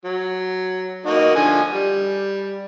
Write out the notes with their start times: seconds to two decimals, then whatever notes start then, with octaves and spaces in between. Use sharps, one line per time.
0.05 F#3
1.06 A#3 D#4 F#4
1.35 D3 F3 G#5
1.73 G3